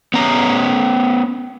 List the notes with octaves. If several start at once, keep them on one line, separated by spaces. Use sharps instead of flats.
B3 C#4 A#5